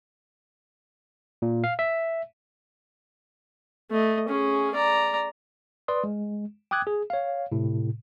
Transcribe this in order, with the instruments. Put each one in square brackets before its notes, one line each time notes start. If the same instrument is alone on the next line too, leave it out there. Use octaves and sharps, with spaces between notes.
[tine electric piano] A#2
F5
E5
[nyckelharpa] A3 D#5
C#4 G#4
D5 A#5
[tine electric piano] B4 D5 C6 D#6
G#3
G5 D6 D#6 F#6 G#6
G#4
C#5 F5
A2 C3